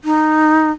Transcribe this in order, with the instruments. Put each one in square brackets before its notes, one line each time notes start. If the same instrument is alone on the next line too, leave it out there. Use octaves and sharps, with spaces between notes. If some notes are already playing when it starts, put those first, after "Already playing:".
[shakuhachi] D#4